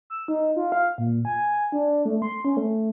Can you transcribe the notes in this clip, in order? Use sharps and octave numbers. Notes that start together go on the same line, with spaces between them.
E6
D#4
F4
F5
A#2
G#5
D4
A3
C6
C#4
A3